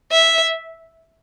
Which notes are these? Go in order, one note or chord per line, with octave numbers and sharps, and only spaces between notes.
E5